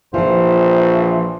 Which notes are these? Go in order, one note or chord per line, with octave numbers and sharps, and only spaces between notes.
A#1 E3 F3 F4 C5